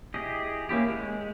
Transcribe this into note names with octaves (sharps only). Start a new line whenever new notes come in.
E4 G4 G#4 D#5
A#3 C#4 E4 G4
G#3